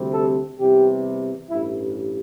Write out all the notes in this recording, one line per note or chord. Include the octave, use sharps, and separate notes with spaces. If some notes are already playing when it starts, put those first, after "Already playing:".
Already playing: D2 C3 G3 C4
A4
E2 C3 G3 G4
A1 G2 G3 E4